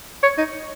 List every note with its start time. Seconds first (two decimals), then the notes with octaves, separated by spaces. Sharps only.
0.23 C#5
0.38 D#4